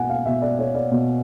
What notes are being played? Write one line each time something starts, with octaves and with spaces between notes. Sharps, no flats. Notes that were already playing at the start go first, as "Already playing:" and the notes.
Already playing: B2 F#5 G#5
F5
B2 E5
D5
C#5
D5
B2